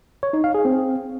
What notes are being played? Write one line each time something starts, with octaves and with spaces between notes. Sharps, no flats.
C#5
D#4
F5
G#4
C4